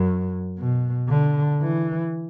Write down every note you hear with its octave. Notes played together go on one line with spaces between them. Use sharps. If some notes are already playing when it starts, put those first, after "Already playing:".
Already playing: F#2
B2
D3
E3